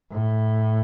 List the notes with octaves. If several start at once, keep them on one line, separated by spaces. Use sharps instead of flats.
A2